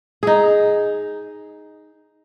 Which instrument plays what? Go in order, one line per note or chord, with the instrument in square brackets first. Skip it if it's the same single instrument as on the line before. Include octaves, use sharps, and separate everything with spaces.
[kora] D#4 G#4